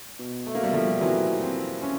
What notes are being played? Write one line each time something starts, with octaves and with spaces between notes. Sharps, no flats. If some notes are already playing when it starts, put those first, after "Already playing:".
B2
A3
A#3
B2 G3 A3
F3 G3
E3 F#3 C4
C4
C#4